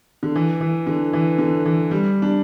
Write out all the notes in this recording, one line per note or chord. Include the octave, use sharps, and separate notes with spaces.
D3
E3
E3
D3
E3
D3
E3
G3
D4